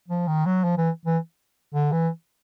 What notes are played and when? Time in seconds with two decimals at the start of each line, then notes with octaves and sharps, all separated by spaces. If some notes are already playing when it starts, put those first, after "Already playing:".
0.08 F3
0.28 D#3
0.46 F#3
0.64 F3
0.78 E3
1.05 E3
1.74 D3
1.92 E3